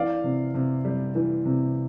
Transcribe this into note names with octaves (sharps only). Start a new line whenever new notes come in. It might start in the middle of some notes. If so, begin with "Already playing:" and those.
Already playing: E3 D5 F5
C3
C3
G3
E3
C3